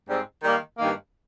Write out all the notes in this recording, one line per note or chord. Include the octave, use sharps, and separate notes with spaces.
G#2 G3 C4
D#3 G3 A#3
G2 D#3 A#3